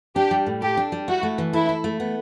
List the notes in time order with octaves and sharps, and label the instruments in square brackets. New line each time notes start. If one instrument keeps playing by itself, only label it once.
[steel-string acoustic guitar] D4 [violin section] G4
[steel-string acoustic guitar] G3
A2
[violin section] G4 [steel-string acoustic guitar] A4
[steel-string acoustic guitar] D4
G3
[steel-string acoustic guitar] E4 [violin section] F#4
[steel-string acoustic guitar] A3
E3
[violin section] E4 [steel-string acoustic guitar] A4
[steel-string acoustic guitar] E4
A3
B3